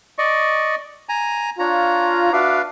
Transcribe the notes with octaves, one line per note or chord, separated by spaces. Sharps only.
D5 D#5 C#6
G#5 A#5
D4 F4 C#5 A#5
D4 F#4 B4 E5 F5 D6